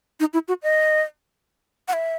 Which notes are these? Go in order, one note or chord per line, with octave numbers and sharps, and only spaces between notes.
D#4
E4
F#4
D#5
F#5
E5